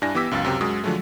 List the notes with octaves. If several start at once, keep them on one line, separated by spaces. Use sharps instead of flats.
G2 D4 E4 G#5 A#6
E3 B3 G4 D6 E6 B6
C#2 F#2 F5 E6 A6
F#2 C3 G5
F#2 G#3 F#4 C#6 D#6
D3 F3 F#3 G#3 A3